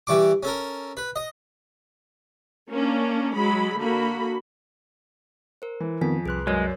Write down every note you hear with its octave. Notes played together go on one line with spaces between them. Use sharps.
E3 G3 C#6 D6
C#4 A4 A#4
B4
D#5
A#3 C#4 D4
F#3 G#3 B5
D3 A#3 F#4 B5
A#4 C5
E3
F2 D#3 B3 C4 G#5 B6
C2 G#4 B4 C6 F#6
F#2 G#3 A#4 C#5 D5